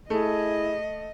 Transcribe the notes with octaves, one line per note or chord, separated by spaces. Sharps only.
A3 E4 G#4 D#5